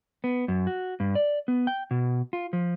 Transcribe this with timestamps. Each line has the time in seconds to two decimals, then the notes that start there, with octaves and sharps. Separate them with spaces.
0.24 B3
0.48 F#2
0.67 F#4
1.00 G2
1.15 D5
1.48 B3
1.67 G5
1.91 B2
2.33 F4
2.53 F3